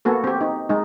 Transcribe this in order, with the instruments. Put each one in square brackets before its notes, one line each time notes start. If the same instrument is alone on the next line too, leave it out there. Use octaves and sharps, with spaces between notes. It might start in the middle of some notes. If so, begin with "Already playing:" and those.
[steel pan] A#3 B3 F#4 A4
C4 G4
D#4
G#3 D#4